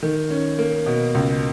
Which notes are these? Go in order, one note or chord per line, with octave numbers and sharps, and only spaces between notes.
D#3
C#4
A#3
B2
C#2